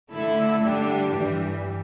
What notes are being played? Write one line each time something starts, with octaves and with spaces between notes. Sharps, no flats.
D3 A3 E4 A4
D3 G3 D4 G4
G2 E3 G3